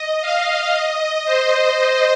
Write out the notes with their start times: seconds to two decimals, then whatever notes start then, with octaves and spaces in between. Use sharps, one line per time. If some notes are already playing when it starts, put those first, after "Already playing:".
Already playing: D#5
0.21 F5
0.74 D#5
1.25 C5